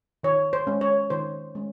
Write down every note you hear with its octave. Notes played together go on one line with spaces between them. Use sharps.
D#3 C#5
C5
G#3 C#4
C#5
D#3 C5
G#3 C#4